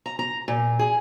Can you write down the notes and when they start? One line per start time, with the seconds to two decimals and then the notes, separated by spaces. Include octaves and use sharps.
0.06 A#5
0.19 A#5
0.48 A#2
0.79 G#4